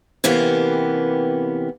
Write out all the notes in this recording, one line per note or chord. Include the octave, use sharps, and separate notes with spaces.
C3 E3 A#3 B3 C#4 G4